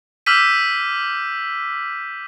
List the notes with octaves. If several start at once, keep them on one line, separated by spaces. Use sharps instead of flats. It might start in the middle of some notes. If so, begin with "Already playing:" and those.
D6 E6 F6 G6 B6 D#7